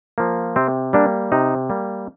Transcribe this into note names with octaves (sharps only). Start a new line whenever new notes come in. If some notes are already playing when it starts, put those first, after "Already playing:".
F3 A#3
C3 C4
G3 A#3 D4
C3 D#4
G3 A#3